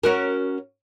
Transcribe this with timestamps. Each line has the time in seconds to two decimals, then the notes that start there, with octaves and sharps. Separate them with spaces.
0.03 C#4 F#4 A#4